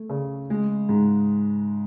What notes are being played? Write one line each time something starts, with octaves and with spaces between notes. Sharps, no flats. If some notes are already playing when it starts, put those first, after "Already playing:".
Already playing: A3
C#3
G#3
G#2